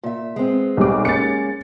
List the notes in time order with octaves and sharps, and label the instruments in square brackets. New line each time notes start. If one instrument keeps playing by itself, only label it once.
[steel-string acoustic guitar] A#2 E5
G#3 B3 C4
[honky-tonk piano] B1 G3 D6
[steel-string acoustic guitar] G#3 A#3 C#4 [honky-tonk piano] A6 C#7